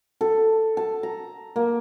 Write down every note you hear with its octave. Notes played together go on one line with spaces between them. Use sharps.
A4
A5
A#5
A#3